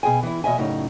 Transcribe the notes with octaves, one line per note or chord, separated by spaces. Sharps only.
B2 G#4 G5 G#5
E3 E4
E2 B2 D#5 E5 G#5
F#2 A2 C#3 D#4